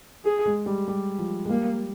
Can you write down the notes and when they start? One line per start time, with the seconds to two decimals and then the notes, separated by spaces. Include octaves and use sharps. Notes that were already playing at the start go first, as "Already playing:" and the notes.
0.25 G#4
0.46 G#3
0.66 G3
0.88 G3
1.19 F3
1.45 G#3
1.49 G3 A#3